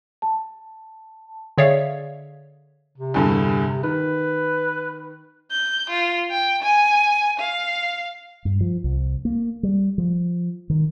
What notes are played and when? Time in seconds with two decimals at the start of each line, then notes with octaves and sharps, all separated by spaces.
0.22 A5
1.58 D3 G#4 C#5 D5 E5 F5
2.97 C3
3.14 E2 G2 D3
3.83 D#3 B4
5.51 G6
5.90 F4
6.31 G5
6.62 G#5
7.39 F5
8.45 G2
8.61 F3
8.84 C2
9.25 A#3
9.63 G3
9.98 F3
10.70 D#3